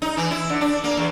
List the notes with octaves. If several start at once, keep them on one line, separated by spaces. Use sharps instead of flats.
D#4
E3
E4
D3
D4
A#3
E2